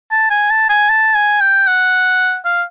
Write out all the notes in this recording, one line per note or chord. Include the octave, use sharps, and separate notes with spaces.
A5
G#5
A5
G#5
A5
G#5
G5
F#5
F5